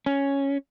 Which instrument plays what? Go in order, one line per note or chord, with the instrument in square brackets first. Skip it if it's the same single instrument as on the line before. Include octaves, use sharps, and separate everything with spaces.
[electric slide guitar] C#4